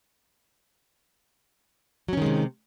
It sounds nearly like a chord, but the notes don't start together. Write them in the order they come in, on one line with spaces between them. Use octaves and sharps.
F#3 C#4 D#3 G#3 C3